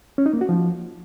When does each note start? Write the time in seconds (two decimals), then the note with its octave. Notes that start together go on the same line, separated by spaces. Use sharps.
0.18 C#4
0.26 D#4
0.33 A#3
0.41 F#4
0.49 F3